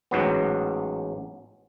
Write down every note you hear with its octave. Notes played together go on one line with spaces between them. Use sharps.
A1 G#2 F#3 B3